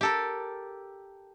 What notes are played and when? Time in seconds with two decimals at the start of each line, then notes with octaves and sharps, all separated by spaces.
0.01 G4 A4 A#4